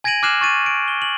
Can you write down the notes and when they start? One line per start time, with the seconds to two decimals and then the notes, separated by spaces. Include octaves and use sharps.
0.04 G#5 G#6 A#6 D7 D#7 F#7
0.23 D6 F6 F#6 C7 E7 F#7
0.41 C#6 A6 D#7
0.66 D7
0.88 G7
1.02 F#7